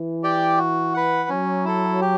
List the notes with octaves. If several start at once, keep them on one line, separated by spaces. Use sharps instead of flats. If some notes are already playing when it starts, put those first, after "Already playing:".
Already playing: E3
G4 D5 G5
F#4
B4 F#5
F#3 C#4
E4 A4
G4